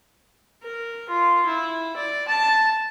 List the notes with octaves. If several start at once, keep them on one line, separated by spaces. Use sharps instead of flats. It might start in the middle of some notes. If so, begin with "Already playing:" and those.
A#4
F4
E4
D5
A5